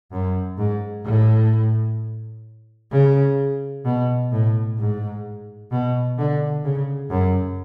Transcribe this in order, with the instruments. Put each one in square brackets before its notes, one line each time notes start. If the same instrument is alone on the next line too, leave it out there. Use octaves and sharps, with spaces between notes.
[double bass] F#2
G#2
A2
C#3
B2
A2
G#2
B2
D3
C#3
F#2